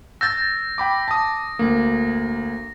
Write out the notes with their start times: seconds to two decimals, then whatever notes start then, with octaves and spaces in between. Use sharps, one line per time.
0.21 E6 G6 A6 A#6
0.78 G5 B5 D6
1.08 A5 D#6
1.59 D2 A#3